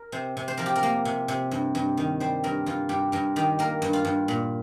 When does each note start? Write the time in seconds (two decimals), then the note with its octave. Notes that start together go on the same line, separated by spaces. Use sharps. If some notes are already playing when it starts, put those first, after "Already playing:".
Already playing: A#4
0.12 C3 C5
0.37 C3
0.48 C5
0.57 F3 A#4
0.66 G4
0.76 A#4
0.83 A#3
1.05 C3
1.28 C3
1.51 G2
1.75 G2
1.97 D#3
2.20 G3 C5
2.44 G2 A#4
2.66 G2 F4
2.89 G2 G4
3.12 G2 A#4
3.36 D#3 G4
3.59 A#3 A#4
3.82 G2
3.93 F4
4.05 G2
4.28 A#2